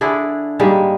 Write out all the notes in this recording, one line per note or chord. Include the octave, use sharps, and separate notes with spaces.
D3 D4 E4 G#4
G#2 G3 G#3 A#3